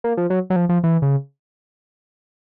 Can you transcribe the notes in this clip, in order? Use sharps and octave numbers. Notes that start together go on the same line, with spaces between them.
A#3
F3
F#3
F#3
F3
F3
E3
C#3